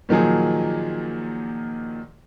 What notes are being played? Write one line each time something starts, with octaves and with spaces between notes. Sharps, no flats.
A#2 D#3 F3 F#3 G#4